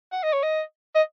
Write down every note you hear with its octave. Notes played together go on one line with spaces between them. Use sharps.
F#5
D#5
C#5
D#5
D#5